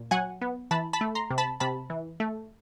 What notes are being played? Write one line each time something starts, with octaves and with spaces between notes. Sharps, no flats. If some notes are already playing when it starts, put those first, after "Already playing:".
Already playing: A#2
F#3 F#5 G#5
B3
E3 A5 B5
A5 B5
A3
A#5 C6
C3
A5 B5
C3 A5 B5
E3
A3